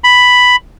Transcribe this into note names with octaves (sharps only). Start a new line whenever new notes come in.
B5